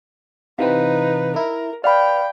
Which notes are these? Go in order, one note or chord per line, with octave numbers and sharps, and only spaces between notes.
C3 E3 C4 D#4 B4 F5
E4 A#4
B4 D5 F5 G5 B5 F6